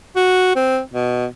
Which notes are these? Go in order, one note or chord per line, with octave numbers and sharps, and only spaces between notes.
F#4
C4
B2